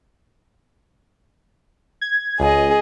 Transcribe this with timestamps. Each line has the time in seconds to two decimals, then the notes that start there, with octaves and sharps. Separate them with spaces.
2.01 G#6
2.40 C#2 G#4 D#5